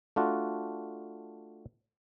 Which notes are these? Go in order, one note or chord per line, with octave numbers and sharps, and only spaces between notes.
A3 D4 F4 F#4